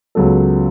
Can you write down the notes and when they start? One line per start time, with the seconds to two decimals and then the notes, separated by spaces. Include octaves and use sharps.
0.15 C#2 C#3 F#3 B3 A4